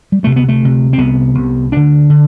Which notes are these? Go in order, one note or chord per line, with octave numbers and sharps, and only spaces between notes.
G3
D2 C3 A3
B3
A3
D2 C3
C4
C2 C3 B3
C2 C3
D2 D3 D4
D3